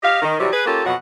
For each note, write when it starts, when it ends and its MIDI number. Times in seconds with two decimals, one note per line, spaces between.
0.03 0.21 67
0.03 0.21 75
0.03 0.21 77
0.22 0.35 51
0.40 0.51 48
0.40 0.51 52
0.40 0.51 54
0.40 0.51 55
0.53 0.65 68
0.53 0.65 71
0.66 0.81 58
0.66 0.81 61
0.66 0.81 65
0.66 0.81 67
0.66 0.81 69
0.85 0.94 41
0.85 0.94 47
0.85 0.94 54
0.85 0.94 78